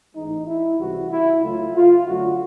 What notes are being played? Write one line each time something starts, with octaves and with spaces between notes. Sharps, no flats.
A1 G#2 E3 G#3 D#4
E4
C#2 C3 E3 G3 F#4
E4
C#2 C#3 F#3 A3 F4
F4
F#2 D3 F#3 A3 F#4